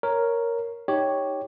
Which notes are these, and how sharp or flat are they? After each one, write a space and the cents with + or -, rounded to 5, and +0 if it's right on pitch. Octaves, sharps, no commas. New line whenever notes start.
A#4 +0 C#5 +0
D#4 +0 G4 +0 C#5 +0